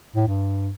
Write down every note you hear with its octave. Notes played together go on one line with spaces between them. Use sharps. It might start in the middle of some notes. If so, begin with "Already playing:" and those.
A2
G2